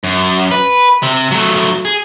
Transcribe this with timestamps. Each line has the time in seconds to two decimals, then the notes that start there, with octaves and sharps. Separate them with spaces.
0.04 F#2
0.51 B4
1.03 C3 C4
1.31 F#3 A3
1.85 G#4